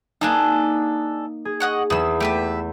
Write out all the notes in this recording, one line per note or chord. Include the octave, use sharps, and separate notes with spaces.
A#3 D4 D#4 G#4 A4
G#4
D#5 F#5 C#6
E2 E3 G#4 E6
A3 G4 B4 E5